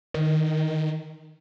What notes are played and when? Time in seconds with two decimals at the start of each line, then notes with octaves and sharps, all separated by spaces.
0.14 D#3